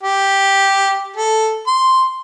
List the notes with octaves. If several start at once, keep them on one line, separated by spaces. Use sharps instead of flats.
G4
A4
C6